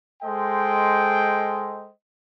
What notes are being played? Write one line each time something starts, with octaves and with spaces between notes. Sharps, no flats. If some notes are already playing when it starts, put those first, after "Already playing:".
G#3 A4 C5 D#5 G5